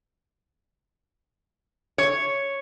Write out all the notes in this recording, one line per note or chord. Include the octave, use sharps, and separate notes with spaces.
C#5